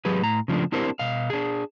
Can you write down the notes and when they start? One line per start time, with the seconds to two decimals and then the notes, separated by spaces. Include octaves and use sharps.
0.05 F#3 G4 G#4 B4
0.21 A2 A#5
0.48 C#3 F3 A3 D4
0.72 C4 D4 E4 G4 A#4 C5
0.99 B2 D#5 F5
1.30 D4 G#4